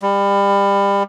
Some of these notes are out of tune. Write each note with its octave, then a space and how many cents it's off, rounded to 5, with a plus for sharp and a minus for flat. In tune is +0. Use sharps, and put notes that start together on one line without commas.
G3 +30